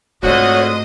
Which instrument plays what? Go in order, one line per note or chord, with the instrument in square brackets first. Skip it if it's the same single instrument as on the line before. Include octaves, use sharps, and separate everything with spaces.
[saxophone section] F2 D3 F#4 [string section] G#2 C5 D#5 [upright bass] A3 [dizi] C#5